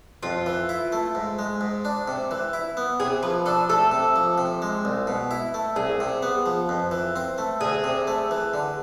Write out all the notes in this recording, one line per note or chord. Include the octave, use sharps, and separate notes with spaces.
F2 F4
E3
E4
A3
G#2
G#3
G#2
D4
C3
E3
E4
B3
C3 G#4
F3 B4
D4 A4
A3 A4
C3
F3
C3
G#3
C2
B2
E4
A3
C2 G#4
C3
B3
F3
F2
E3
C4
A3
D2 G#4
C3
A3
E3
D3